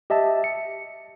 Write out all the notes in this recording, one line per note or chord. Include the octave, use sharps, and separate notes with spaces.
G4 D#5 E5 A5
C#7